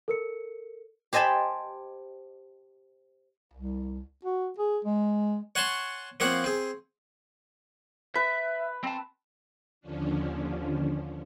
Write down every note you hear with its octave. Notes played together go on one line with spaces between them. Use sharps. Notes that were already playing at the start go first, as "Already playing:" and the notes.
A4 A#4 C#7
G4 C5 D#5 G#5 A5 B5
C2
F#4
G#4
G#3
C#5 F#5 G#5 A5 C6 C#6
F3 A#3 C4 C#5 F#5
C4 G#4
B4 E5
C4 A5
D#2 D3 F3 C#4 D4